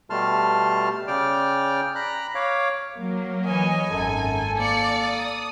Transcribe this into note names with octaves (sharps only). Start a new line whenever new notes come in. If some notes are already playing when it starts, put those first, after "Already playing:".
B2 G3 A3 A5 C6 F6
C#3 D5 G5 D6 F6
A#5 B5 F#6
C#5 F5 D6
F#3 A#3
E3 C#5 D#5 G#5
G#1 F#2 A4
A#3 D5 C#7
D#6